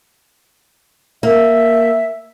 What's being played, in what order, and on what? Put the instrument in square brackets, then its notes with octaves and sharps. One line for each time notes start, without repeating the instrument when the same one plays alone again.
[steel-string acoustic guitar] A#3 [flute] E5